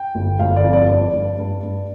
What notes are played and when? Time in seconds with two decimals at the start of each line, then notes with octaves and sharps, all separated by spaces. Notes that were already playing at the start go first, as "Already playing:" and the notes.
Already playing: G5
0.15 G1
0.39 G1 F5
0.56 D5
0.64 F2
0.73 D5
0.89 G2 D5
1.14 G2
1.39 G2
1.63 G2